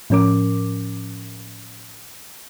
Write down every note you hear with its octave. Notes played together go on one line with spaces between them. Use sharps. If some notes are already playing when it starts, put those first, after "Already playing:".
A2 F3 C#4 A#4 D6